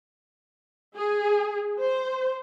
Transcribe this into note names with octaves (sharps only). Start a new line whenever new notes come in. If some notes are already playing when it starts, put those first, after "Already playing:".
G#4
C5